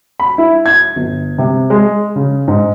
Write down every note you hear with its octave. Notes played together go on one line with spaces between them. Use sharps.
B5
E4
G#6
G1
C3
G#3
C#3
G#2